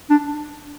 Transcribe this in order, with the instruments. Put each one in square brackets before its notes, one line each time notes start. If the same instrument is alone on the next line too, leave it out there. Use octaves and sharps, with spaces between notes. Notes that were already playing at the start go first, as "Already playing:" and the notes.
[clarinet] D4